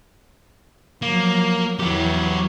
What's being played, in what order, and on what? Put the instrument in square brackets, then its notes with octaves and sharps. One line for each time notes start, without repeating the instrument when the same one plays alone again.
[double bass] F3 F#3 [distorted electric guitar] A#3
[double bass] E2 E3 [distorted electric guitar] F#3 G4